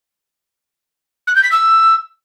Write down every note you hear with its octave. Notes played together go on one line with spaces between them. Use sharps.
F#6
G6
B6
E6